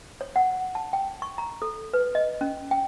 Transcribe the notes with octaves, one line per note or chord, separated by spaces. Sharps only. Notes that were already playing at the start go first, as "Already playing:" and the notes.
C#5
F#5
A5
G5
C#6
A#5
A4
B4
D#5
C#4
G5